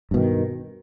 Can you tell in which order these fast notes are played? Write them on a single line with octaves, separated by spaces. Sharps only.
G2 B2 D#3